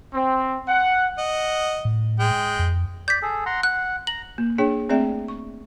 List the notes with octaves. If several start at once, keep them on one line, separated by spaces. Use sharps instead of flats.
C4
F#5
D#5 F#5
A2
G#3 G5
F2
D5 G6 B6
G#4 A4
F#5 A#5 C6
F#5 F#6
A#5 F#7
A#3
D4 G#4 C#5 G5
A3 C4 G#4 D5 E5 G5
C#6